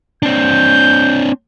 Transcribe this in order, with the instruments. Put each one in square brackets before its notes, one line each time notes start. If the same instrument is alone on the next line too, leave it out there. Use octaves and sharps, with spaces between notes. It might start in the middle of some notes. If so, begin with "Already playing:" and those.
[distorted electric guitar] C4 D4 [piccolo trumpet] G6